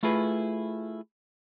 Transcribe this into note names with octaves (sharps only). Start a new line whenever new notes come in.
A3 E4 F4 G#4 B4